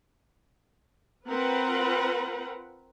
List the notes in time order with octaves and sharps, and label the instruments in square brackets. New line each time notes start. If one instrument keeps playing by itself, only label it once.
[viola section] C4 F4 A#4 B4 F#5